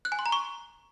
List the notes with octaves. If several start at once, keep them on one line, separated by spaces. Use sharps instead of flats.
F#6
G#5
C6
A#5
C#6